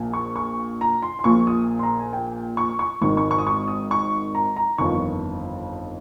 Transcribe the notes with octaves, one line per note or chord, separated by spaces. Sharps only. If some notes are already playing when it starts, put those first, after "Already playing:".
Already playing: A#1 A#2 F3
C#6
C#6
A#5
C6
C6
A#1 A#2 F3 C#6
D#6
C6
A#5
G#5
G5
C#6
C#6
G#1 G#2 D#3 C#6
C#6
C#6
D#6
C#6
D#6
C#6
A#5
A#5
G1 F2 D#3 C#6